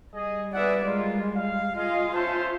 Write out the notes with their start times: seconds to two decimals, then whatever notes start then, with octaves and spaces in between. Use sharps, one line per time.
0.13 G3 G#4 D#5
0.53 G#4 B4 D5 E5 F#5
0.85 G#3 A#3 F4
1.35 F5
1.76 F4 G#4 D#5 F5
2.14 C#4 C5 E5 A5